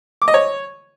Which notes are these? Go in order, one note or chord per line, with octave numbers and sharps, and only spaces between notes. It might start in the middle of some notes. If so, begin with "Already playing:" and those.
D6
D#5
C#5